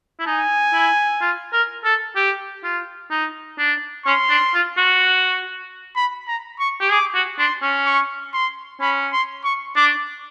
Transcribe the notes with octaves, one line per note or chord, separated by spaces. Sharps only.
E4
D#4 G#5
E4
F4
A#4
A4
G4
F4
D#4
D4
C#4 C6
D4
F4
F#4
B5
A#5
C#6
G4
G#4 D6
F#4
D4 C6
C#4
C#6
C6
C#4 B5
C6
C#6
D4 D6